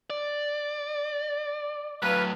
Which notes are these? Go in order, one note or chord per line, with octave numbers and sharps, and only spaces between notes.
D5
A2 F#3 B4 F5